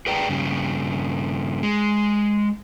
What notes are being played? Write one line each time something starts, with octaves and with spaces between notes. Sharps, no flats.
G#4 B4 D5 G5 A#5
G2 C#3
G#3